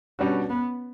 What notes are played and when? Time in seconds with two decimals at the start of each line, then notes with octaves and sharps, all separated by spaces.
0.19 B2 G3 C#4 D4 F#4
0.49 B3